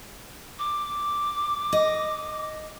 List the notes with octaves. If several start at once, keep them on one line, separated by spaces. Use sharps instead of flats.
D6
D#5